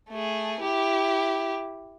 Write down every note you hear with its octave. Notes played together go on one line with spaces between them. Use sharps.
A3 G#4
E4 G4